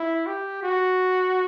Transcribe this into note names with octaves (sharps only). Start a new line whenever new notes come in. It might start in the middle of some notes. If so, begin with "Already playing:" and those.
Already playing: E4
G4
F#4